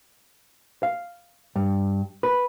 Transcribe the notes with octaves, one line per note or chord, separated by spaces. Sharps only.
F5
G2
B4